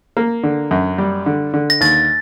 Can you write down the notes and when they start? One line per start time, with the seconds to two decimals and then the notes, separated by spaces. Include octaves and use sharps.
0.17 A#3
0.43 D3
0.71 F#2
0.98 G3
1.26 D3
1.54 D3
1.70 A#6
1.81 D#2 A6